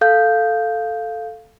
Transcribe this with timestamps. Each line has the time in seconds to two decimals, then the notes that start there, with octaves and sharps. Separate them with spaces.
0.01 A4 F5 G6